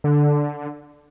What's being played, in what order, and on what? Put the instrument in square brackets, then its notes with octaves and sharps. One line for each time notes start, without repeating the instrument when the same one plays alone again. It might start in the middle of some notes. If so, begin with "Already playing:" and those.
[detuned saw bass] D3